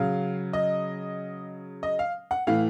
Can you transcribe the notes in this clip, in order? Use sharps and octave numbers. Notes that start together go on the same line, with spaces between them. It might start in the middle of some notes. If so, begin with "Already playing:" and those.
Already playing: C#3 F#3 F5
D#5
D#5
F5
F#5
A2 E3 F5